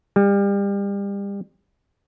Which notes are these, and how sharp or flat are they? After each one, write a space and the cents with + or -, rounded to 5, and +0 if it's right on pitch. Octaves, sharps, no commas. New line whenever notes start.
G3 +30